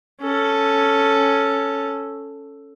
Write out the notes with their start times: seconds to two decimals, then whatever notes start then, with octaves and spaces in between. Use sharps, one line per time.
0.21 C#4 A4